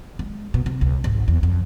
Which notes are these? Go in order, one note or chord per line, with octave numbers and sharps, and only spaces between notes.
G#3
B2
C3
C#2
G#1
E2
F2